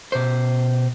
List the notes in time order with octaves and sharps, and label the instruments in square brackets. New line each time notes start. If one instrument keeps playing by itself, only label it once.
[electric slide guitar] B2 C5